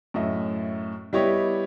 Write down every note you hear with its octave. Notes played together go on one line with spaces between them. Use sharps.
F#2 A2 D#5 E5
G3 B3 E4 G4 C#5 D#5